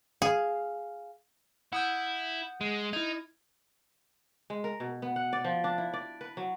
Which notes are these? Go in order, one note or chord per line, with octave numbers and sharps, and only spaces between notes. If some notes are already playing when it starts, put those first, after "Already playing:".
G#4 F5
E4 F#5 D#6 G6
G#3
D#4 E4 G#6
G#3
A#4
B2
B3
F#5
D5
F3
D4
E4
D5
B4
F#3